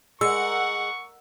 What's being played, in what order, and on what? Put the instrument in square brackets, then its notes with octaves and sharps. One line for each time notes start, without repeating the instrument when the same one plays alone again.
[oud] G#3 [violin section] A#4 F#5 [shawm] C#6 [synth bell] E6